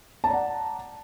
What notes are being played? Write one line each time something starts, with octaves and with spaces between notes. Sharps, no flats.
D5 F#5 A5 A#5